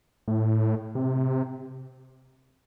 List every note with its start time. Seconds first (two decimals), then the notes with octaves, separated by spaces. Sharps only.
0.28 A2
0.95 C3